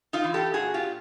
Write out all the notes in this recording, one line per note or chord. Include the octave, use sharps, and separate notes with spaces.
D#4 F4
E3
G4 A4
A#2 F#4 G#4
F4 G4
A#2